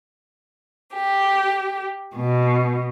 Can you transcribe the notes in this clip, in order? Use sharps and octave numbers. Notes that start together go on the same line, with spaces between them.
G4
B2